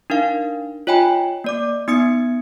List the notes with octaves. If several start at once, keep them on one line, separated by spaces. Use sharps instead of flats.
D4 D#4 A#4 F5
F4 C#5 D#5 G5 G#5 B5
A#3 D5 D6
B3 D#4 D#6 G#6 C#7